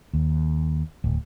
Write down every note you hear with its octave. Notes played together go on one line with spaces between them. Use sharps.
D#2
D1